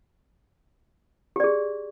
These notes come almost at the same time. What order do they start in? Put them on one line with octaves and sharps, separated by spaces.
G4 D5 G#4